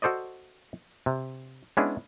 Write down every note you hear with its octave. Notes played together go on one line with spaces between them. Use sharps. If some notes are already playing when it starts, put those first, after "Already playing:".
F#4 A4 C5 D5 D#5
C3
G#3 B3 C#4 D4 E4 G#4